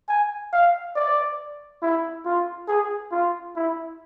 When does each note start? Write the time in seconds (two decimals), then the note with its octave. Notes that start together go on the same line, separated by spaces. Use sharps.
0.09 G#5
0.53 F5
0.96 D5
1.82 E4
2.25 F4
2.68 G#4
3.12 F4
3.55 E4